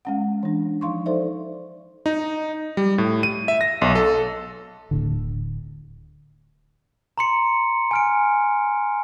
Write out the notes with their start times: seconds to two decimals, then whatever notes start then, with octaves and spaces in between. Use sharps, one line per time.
0.05 G#3 C#4 F#5
0.43 E3 D4
0.81 F3 D#4 F5 C6 C#6
1.06 D#4 A4 C5 D5 E5
2.06 D#4
2.77 G3
2.98 A2
3.23 D#7
3.48 E5
3.61 A#6
3.82 B1
3.95 A4
4.91 D1 A2 D3
7.18 A#5 C6 C#7
7.91 G#5 F6 D7